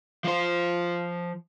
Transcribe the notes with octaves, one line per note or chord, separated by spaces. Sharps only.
F3 C5